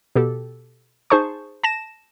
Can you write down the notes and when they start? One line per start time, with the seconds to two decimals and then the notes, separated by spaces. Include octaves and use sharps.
0.16 B2 G4 A4
1.10 D#4 G#4 C5 A5 C#6
1.64 A5 A#6 E7